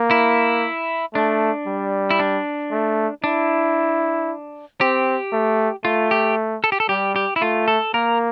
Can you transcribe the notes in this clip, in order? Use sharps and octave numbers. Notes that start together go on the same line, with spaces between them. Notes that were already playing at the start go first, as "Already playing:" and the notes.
Already playing: A#3
E4
A3 D4
G3
E4
D4
A3
D4 E4
C4 G4
A3
A3 F4
G4
A4
G4
A4
G3 G4
G4
E4
A3 F4
A4
A#3 A#4